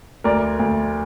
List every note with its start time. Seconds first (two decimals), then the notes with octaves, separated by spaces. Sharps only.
0.24 D2 A#4 D5
0.59 D2